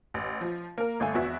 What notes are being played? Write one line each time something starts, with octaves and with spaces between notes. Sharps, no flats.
A1
F3
A#3 A#4
G1 A3 F5 G#5
G#1 E2 F#4 E5